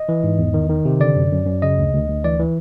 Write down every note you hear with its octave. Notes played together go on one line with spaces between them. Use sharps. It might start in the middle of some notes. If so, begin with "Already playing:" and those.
Already playing: D#5
E3
G#2
E2
D#3
D#3
C3
D3 D5
F#2
F#2
F#2
C#3 D#5
D2
D2
D2
E3 D5
E3